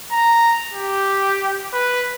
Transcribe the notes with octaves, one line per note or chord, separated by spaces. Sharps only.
A#5
G4
B4